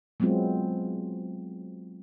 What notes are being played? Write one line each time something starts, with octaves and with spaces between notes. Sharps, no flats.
F#3 G#3 B3 C4 F4